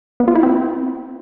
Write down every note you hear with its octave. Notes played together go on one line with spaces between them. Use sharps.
B3
F4
E4
C4